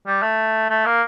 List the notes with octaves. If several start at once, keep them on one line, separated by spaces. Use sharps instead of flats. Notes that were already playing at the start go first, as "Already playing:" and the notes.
G3
A3
A3
A#3